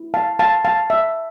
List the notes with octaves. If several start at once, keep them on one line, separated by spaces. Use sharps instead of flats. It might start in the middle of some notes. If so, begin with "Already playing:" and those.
Already playing: E4
F5 A5
F5 A5
F5 A5
E5